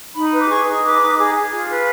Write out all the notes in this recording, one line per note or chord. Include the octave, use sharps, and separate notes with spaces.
D#4 B5
B4
D6
G#4 C#6
D#4
B4 D6
D#4
G#4
G#4
F4
B4